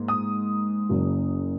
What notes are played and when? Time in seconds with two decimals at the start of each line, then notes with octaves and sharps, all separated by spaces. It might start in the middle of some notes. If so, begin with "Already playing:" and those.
Already playing: G#2 A#3
0.08 D#6
0.89 F#1 F#2 C#3 A#3